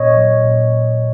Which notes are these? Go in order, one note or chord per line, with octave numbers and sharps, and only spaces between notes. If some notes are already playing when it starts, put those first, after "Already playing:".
Already playing: A#2 C#5 D#5
F#3
A#2